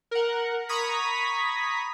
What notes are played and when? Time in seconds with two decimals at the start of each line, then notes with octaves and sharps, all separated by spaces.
0.11 A#4 F#5
0.69 A#5 B5 C#6 D#6 G#6 B6